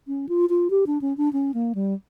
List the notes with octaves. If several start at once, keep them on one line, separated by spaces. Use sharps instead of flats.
C#4
F4
F4
G4
D4
C#4
D4
C#4
A#3
G3